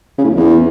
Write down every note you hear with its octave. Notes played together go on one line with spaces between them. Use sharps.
C#3
A2
F2
E2